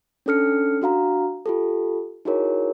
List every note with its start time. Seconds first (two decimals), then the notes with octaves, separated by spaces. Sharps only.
0.26 C#4 D4 A4 F6 C#7
0.82 D4 F#4 F5 A#5
1.46 F4 G4 A4
2.25 D#4 E4 F#4 G#4 A#4 C#5